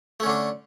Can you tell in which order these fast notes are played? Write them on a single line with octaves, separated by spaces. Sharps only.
A3 C#4 D3 D4